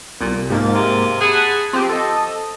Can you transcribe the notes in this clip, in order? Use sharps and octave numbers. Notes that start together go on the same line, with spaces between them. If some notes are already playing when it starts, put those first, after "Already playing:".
C2 A#2
G#2 F3 A#3 A6
C3
G#4 F#5 A5 B5
F3 C4 G4
A4 D#5